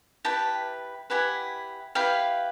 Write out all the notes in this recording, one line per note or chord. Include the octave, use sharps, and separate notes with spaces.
E4 G4 B4 G5 A5
E4 G4 B4 F#5 G#5
E4 G4 B4 F5 G5